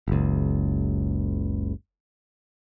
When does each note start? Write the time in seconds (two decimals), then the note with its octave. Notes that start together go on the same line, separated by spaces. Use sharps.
0.08 F#1 C#2